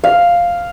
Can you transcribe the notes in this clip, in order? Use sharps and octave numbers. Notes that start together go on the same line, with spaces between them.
F5